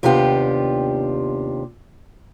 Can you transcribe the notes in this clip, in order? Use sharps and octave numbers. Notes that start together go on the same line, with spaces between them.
D#2 C3 B3 D4 F4 G4